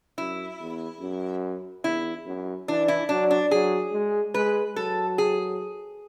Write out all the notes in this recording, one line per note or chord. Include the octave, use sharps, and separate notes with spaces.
F#2 E4
E2
F#2
E2 E4
F#2
E3 D4
E4
F#3 D4
D4
F#3 G#4
G#3
G#3 B4
F#3 A4
G#4